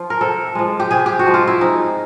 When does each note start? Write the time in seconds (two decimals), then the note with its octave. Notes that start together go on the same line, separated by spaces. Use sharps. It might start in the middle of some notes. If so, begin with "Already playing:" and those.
Already playing: F3 F4
0.10 A#4
0.21 C3 A4
0.55 F3 G#3
0.80 G4
0.91 C3 G#4
1.06 G4
1.19 F#4
1.26 F3 G#3
1.34 F4
1.47 E4
1.61 C3 D#4